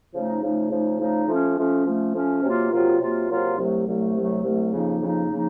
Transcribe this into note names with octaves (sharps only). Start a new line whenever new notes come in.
C#3 F3 A3 D#4
C#3 F3 A3 D#4
C#3 F3 A3 D#4
C#3 F3 A3 D#4
F3 A3 C#4
F3 A3 C#4
F3 A3 C#4
F3 A3 C#4
C3 F#3 A#3 F4
C3 F#3 A#3 F4
C3 F#3 A#3 F4
C3 F#3 A#3 F4
C2 C3 F#3 A3
C2 C3 F#3 A3
C2 C3 F#3 A3
C2 C3 F#3 A3
F2 C#3 F3 A#3 D#4
F2 C#3 F3 A#3 D#4
C#3 F3 A#3 D#4